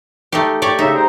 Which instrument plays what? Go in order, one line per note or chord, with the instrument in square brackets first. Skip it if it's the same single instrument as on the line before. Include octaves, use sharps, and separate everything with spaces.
[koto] A3 D#4 G4
G4 C#5 D5
[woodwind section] C#3 E5 [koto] D#4
[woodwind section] G3 C5 A#5